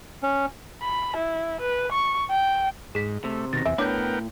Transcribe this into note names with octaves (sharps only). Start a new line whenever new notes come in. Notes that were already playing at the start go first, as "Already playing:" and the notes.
C#4
B5
E4
B4
C#6
G5
G#2 G#4 B6
C3 A3
B2 D#3 A6 A#6
E2 E5 G#5
A2 B3 D4 A#4 C#5 G5 G6